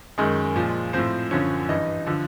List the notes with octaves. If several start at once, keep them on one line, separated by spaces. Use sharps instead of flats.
F#2 D#3 G#3 G#4
A#2 F3
A2 F3 C4 C5
F#2 D3 F3 C#4 C#5
G2 E3 D#4 D#5
D3 F3